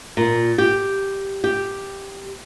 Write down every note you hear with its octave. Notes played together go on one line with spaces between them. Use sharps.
A#2
G4
G4